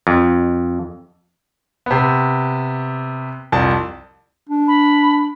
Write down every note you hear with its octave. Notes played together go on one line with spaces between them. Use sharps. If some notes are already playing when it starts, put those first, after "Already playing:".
F2
C3 B3
C2 F2 A5
D4
B5